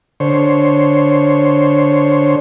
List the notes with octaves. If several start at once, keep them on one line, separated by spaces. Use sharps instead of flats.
D3 C5 C#5